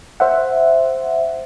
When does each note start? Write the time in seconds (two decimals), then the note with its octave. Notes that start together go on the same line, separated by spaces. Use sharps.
0.20 C5 E5 F#5